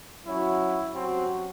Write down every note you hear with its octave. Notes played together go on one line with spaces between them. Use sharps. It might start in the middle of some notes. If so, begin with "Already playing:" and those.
F#3 C#4 E4 F#4
C3 F#3 C4 C#4 F#4